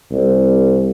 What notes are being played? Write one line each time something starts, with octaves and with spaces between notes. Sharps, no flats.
C2